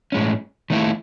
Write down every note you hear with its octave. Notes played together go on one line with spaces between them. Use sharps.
A2 G#3 C#4
D#3 A3 E4